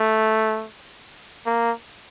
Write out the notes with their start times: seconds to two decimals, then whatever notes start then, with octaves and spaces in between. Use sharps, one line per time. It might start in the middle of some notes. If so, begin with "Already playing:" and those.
Already playing: A3
1.46 A#3